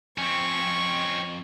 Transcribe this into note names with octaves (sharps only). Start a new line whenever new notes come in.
F2 C4 C#4 C#6